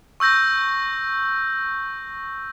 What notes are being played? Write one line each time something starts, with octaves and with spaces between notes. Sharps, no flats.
C#6 E6 G6 A#6